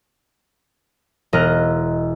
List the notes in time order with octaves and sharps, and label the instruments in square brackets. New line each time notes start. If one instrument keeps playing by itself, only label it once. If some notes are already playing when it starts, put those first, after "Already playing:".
[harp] E1 A#4 D#5 A#5 F#6